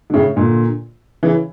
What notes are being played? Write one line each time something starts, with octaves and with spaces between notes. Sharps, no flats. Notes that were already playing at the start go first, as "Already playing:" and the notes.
D3
A2 C#3
A#2 D3
C#3 E3